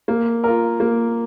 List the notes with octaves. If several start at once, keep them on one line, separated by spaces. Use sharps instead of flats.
A#3
F4 A#4
A#3